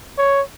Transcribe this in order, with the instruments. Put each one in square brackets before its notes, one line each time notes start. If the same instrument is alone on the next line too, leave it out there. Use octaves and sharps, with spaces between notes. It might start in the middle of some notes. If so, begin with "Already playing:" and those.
[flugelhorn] C#5